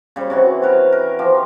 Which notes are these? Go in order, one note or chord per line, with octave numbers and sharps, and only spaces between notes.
C#3 G3
C3 E3 F#4
A#4 B4 C#5
A#4
F3 G4